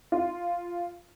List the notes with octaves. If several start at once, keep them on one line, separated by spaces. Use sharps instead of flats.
F4